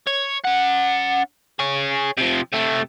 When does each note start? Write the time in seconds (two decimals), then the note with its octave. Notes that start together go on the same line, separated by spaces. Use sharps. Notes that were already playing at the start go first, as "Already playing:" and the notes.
0.07 C#5
0.45 C#4 F#5
1.59 G#4 C#5
2.18 C3 F3
2.54 C3 A3